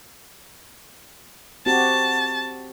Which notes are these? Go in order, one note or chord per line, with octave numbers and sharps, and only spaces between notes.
C4 F#4 G4 A5